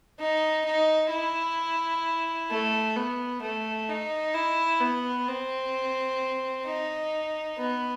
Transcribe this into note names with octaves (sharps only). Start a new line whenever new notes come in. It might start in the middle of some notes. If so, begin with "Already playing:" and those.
D#4
D#4
E4
A3
B3
A3
D#4
E4
B3
C4
D#4
B3